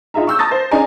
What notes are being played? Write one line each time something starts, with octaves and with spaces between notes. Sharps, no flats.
D#4 F4 G#4 E5 A#5
C#6 E6 G6
A5 A#5 D#6 A6 A#6
C5
C#4 D#4 G#4 D5 G#5 A#5